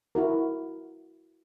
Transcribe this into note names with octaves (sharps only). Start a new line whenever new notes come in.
E4 F#4 A#4